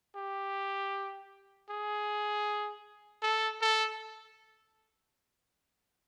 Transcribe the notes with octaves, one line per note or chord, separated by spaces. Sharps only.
G4
G#4
A4
A4